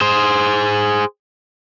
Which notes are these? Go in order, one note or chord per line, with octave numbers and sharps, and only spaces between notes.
G#4 C5